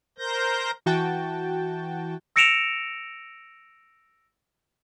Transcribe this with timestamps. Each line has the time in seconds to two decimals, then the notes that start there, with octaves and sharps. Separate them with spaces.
0.18 A#4 C5 G6 A#6
0.86 E3 F#4 G5 A5
2.36 E6 A#6 C#7 D7 E7 F7